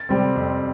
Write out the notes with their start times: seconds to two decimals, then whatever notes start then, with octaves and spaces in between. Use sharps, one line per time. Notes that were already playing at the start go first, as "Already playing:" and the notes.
Already playing: A6
0.09 C3 G3 C4
0.36 F2